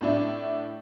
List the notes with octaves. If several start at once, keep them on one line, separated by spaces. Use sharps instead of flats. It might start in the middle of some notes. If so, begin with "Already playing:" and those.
A2 D4 E4